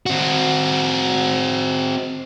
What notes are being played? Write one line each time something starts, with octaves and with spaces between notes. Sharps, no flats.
C4 F#4